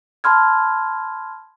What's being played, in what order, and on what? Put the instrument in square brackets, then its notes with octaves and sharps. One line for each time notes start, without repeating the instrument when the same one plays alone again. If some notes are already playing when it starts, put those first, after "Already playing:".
[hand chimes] A5 B5 C6 F6 G#6